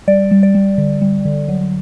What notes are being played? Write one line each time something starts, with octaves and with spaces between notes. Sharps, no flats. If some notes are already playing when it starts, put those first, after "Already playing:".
G3 D5
G3
D5
G3
D3
G3
D3
F#3